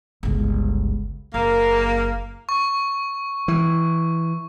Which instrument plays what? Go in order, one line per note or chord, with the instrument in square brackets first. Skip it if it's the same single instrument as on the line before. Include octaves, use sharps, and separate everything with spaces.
[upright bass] G1 C#2
[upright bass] F#1 [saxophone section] A#3
[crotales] C#6
[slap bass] E3